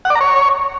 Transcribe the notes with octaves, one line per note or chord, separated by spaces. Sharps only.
F#5
D5
A#5
C#5